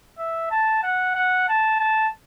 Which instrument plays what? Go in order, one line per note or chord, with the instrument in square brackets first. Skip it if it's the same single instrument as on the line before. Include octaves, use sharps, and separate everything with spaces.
[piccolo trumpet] E5
A5
F#5
F#5
A5
A5